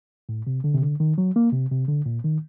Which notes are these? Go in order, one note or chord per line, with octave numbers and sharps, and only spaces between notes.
A2
C3
D3
C3
D3
D#3
F#3
A#3
C3
C3
D3
A#2
D#3